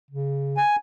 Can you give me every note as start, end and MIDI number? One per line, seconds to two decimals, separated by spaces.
0.11 0.60 49
0.57 0.76 80